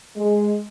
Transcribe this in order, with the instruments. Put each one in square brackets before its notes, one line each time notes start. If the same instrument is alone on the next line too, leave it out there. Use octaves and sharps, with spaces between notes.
[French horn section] G#3